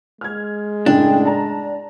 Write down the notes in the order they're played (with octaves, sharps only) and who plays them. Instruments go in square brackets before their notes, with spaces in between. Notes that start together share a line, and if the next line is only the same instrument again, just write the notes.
[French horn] G#3 [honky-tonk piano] F6 G#6
[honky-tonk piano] F#2 A2 C#3 [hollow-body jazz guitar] D4 [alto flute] G5
[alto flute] D5 [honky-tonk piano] A5 A#5